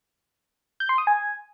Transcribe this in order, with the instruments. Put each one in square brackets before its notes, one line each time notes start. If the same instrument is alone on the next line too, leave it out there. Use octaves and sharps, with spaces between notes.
[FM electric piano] G6
C6
D#6
G#5